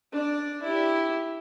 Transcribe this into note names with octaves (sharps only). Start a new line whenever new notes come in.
D4 D5
E4 G4